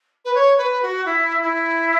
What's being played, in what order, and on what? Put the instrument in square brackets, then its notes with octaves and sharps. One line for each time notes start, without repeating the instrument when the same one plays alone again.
[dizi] B4
C#5
B4
F#4
E4
E4